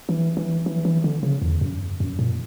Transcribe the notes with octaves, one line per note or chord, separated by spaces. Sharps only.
E3
E3
E3
E3
D3
C#3
E2
F#2
F#2
A#2